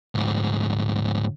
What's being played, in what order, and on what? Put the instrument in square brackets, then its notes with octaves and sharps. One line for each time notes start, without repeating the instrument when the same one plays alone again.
[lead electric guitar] D2 G#2